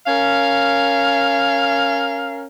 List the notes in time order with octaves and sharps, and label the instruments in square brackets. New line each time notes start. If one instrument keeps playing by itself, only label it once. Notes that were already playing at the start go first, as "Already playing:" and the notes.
[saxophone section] C#4 A#4 F5